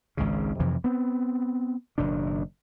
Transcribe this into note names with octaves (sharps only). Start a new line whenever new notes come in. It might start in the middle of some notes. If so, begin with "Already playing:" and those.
G#1 C#2 G#2 C#3
F2 C3 E3 F3
B3 C4
F#1 B2 D#3 D4